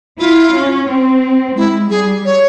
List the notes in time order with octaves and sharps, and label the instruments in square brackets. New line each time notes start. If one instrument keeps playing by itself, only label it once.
[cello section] E4 [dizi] F4
[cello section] C#4
C4
[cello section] G#3 [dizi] E4
[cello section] G3 [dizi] G#4
[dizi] C#5